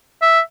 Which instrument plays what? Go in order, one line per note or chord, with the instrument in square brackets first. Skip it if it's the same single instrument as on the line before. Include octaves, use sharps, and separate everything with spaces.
[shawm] E5